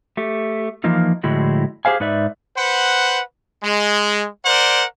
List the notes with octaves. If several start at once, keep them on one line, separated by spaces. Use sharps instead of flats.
A3 G4
E3 F3 A#3 D#4 F4
A2 D3 F3 G#3 E4 F#4
G4 G#4 C5 F5 G#5
G#2 D#4 B4 D5 E5
B4 C5 F#5
G#3
A#4 C5 D5 F#5